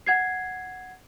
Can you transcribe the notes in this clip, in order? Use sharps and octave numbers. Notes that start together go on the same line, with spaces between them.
F#5 G#6 C7